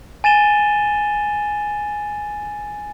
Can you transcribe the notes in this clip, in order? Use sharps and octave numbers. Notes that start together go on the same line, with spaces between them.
G#5 A6 D#7 E7 G7